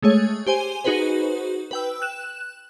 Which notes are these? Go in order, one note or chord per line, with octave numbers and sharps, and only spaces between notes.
G#3 A3 G#4 C#5
G4 C5 G#5 D#7 G7
D#4 F#4 G#4 B4 C5
B4 G5 E6
F#6 E7